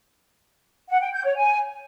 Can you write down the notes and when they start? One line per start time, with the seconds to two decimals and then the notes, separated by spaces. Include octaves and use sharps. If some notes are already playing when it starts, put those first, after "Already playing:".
0.89 F#5
1.01 G5
1.13 G6
1.25 C#5
1.37 G#5